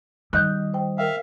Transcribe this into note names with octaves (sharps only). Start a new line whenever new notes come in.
D#3 G3 D#5 F#6 G6
C5 G5
A#4 E5 F5 G5